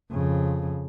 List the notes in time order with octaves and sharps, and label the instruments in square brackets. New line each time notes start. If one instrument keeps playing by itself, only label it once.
[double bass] F2 C#3